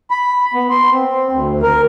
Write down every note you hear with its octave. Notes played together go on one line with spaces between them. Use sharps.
B5
B3
C6
C4
D2
A#4